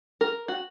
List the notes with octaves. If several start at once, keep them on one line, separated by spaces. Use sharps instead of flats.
A#4
F#4